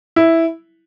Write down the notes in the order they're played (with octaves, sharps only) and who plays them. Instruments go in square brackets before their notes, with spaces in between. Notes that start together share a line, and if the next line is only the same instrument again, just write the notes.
[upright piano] E4